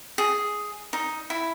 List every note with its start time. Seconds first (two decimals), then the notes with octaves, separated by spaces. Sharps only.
0.18 G#4
0.93 D#4
1.30 E4